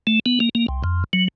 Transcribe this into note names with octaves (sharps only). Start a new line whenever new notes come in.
A3
B3
A#3
A#3
C2
F2
F#3